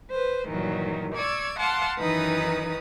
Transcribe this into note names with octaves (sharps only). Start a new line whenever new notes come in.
B4 C5
G2 A#2 D#3 E3 F#3
D5 C#6 E6 G#6
F5 F#5 A5 C6 D6
F#2 D#3 E3 D#4 B4 D#6